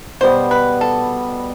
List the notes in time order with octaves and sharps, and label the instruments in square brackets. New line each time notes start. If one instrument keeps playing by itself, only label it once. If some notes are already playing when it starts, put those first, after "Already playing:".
[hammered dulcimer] B2 G3 B3 [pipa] C5
[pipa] B4
A4